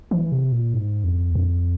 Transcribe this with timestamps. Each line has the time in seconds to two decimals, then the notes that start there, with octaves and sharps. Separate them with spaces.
0.11 E3
0.32 C3
0.52 A#2
0.74 G#2
1.04 F2
1.31 E2
1.35 F2